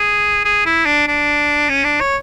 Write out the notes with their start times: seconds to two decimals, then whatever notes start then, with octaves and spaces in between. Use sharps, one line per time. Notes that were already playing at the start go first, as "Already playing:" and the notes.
Already playing: G#4
0.45 G#4
0.65 E4
0.86 D4
1.07 D4
1.69 C#4
1.84 D4
2.00 C#5